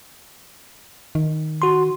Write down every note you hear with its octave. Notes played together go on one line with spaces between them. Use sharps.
D#3
F#4 C6